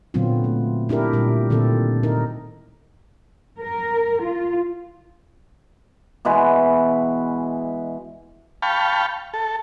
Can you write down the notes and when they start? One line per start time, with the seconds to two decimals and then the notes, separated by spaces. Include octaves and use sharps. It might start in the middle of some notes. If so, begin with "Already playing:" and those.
0.14 A#2 D3 F#3 B3 C4 F4
0.44 A3
0.89 D4 E4 G4 A#4
1.13 A#2 G3 G4
1.50 A#2 D3 D#3 C4 A4
2.03 D#4 A#4
3.59 A#4
4.22 F4
6.25 B2 E3 G#3 B4
8.62 F5 G5 A5 B5 C#6
9.34 A4